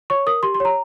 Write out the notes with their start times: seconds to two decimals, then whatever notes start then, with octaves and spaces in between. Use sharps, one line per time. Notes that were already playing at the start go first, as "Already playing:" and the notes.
0.10 C#5 C#6
0.27 A#4 D#6
0.43 G4 C6
0.55 C6
0.60 C#5 A#5